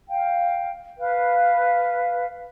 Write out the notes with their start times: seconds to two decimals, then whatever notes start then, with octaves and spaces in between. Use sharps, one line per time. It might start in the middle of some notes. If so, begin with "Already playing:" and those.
0.09 F5 G5
0.98 B4 F5